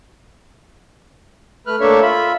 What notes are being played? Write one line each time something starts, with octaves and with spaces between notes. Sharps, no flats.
A3 B4 F6 F#6
A3 A#3 D4 A4 C#5 E5
F4 E5 B5